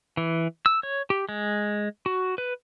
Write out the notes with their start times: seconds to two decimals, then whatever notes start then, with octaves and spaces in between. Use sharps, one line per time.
0.17 E3
0.66 E6
0.83 C#5
1.10 G4
1.29 G#3
2.06 F#4
2.38 B4